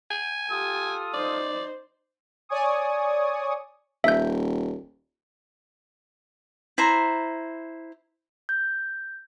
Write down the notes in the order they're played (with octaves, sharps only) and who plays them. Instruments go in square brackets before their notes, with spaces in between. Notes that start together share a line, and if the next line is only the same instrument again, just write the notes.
[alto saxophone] G#5
[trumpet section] F4 A4 D#6 [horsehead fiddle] G4
[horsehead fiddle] D#4 C5 [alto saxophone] D5
[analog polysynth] C#5 D5 G#5 C#6 D#6
[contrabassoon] D#1 [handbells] E5 G6
[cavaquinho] E4 C5 A#5
[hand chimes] G6